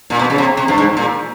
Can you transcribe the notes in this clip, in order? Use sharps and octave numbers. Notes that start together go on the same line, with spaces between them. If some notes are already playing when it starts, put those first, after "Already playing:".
A#2
B2
C#3
C3
C3
G2
G#2
A#2